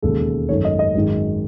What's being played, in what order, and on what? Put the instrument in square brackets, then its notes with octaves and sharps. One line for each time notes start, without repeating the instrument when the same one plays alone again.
[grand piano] E1 D#2 C#3 G#3 A4
G#1 F#2 D#3 A3 C#5
D#5
D#5
G#1 F#2 D#3 G#3